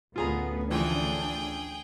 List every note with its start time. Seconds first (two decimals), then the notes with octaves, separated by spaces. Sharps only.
0.16 A1 D2 B3 C#4 F4 G#4 A#5
0.70 C#3 E3 F3 D4 G#4 G5